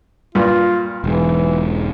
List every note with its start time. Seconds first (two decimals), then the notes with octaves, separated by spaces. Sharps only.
0.35 G2 A#2 F4
1.04 E1 G#2 E3